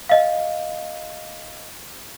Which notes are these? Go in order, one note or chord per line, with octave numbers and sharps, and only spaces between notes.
D#5 F5